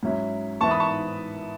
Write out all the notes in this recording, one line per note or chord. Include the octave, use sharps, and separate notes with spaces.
G#2 F#3 C#4 E4
G#2 E3 B3 E4 A5 C#6
B5 D#6
A5 C#6